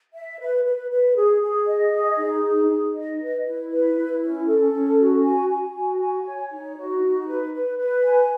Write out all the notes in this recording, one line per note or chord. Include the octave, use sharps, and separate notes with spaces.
E5
B4
B4
B4
G#4
G#4
D#5
G#4
D#4
G#4
D#4
D#5
B4
E4
B4
E4
C#4
A4
C#4
F#4
G#5
G#5
F#4
G#5
C#5
D#4
F#4
D#4
B4
B4
B4
G#5